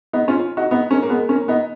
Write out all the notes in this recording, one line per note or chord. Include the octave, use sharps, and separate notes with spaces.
B3 D#4
C#4 F4
D#4 F#4
B3 D#4
A#3 C#4
A#3
G#3 B3
A#3 C#4
B3 D#4